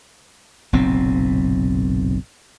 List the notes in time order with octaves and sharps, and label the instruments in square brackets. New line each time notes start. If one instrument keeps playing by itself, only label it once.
[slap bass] F#1 B1 A#2 C4